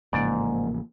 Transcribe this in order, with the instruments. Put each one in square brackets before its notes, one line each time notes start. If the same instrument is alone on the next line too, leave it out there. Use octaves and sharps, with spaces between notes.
[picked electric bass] A1 C#3 F3 [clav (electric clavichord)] G#2 D5 [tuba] A#3